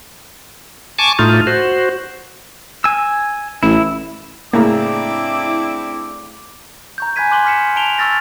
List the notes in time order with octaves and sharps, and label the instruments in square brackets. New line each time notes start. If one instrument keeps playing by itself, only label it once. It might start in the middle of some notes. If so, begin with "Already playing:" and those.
[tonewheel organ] G#5 A5 C#6 D6
A2 A3 D#4 F4
F#4 C5
[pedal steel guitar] G#5 E6
[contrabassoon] A1 [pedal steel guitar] E4
[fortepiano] A2 C#3 A#5 [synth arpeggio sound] A#3 [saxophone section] C4 D4 E4 [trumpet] D6
[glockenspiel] A#5 C#6 G6
G#5 B5 F#6 G#6 B6 D#7
G#5 C6 D6 F#6 F#7 G7
D6 F6 B6 C#7 E7
A5 D7 E7 F7 G7
C#6 E6 F6 A6 A#6